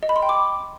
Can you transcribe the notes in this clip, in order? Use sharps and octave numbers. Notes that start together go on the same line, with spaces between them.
D#5
B5
C6
G5
D6